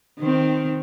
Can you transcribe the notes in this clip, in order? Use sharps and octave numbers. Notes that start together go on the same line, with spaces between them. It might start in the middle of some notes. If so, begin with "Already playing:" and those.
D#3 C4